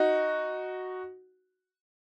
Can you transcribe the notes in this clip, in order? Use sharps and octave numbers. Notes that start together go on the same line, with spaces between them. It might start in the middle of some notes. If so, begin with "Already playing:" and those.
Already playing: D#4 F#4